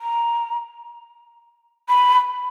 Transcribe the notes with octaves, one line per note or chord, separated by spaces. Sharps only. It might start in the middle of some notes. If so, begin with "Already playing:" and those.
A#5
B5